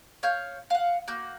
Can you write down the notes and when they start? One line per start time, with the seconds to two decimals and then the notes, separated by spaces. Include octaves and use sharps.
0.23 C#5 F5 G6
0.70 F5 F#5
1.08 A#3 F#4 G6